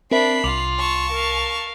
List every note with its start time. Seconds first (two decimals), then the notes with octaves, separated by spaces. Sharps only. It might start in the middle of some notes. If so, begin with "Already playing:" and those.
0.11 C4 D4 A#4 E5 B5 C7
0.44 C2 F4 D6 F7 F#7
0.79 A5 C#6
1.12 A#4 F5